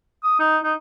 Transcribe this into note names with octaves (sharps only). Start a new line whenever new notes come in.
D#6
D#4
D#4